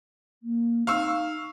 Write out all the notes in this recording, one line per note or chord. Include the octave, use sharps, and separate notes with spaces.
A#3
D#4 F5 C#6 E6